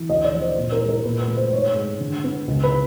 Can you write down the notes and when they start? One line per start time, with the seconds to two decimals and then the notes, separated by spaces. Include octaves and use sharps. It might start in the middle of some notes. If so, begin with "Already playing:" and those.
Already playing: E3
0.09 D2 D#5
0.24 D5
0.33 F3
0.41 C5
0.57 A#2
0.72 A#4
0.81 G#3
0.89 A#4
1.05 A#2 B4
1.21 B4
1.28 A3
1.37 C5
1.52 G#2 C#5
1.76 G#3
2.00 D3
2.24 B3
2.48 C#2
2.64 B4